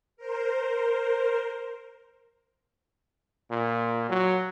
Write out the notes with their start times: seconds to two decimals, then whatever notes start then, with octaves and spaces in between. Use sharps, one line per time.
0.17 A#4 C5
3.51 A#2
4.10 F#3